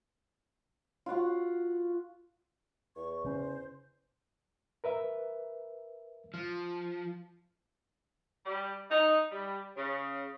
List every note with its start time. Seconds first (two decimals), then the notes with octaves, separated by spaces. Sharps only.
1.06 F4 F#4 F#5 C#6
2.96 E2 C#6
3.24 C#3 C#4 C5
4.84 A#4 B4 E5
6.34 F3 F6
8.45 G3
8.90 D#4
9.31 G3
9.76 C#3